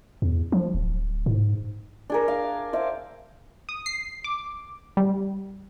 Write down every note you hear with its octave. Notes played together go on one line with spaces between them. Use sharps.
E2
F3
D1
G#2
D4 G#4 A#4
F5
C5 E5 F5 D6
D#6
C7
D6
G3